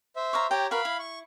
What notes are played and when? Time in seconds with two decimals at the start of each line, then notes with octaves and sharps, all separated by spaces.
0.16 C5 E5
0.33 C#5 F5 A#5
0.51 G4 C#5 G5 A#5
0.71 F#4 A#4 B4 F5 B5
0.85 E4
0.99 C#6